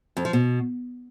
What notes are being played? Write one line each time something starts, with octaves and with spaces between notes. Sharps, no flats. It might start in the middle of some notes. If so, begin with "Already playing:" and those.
F2
F3
B2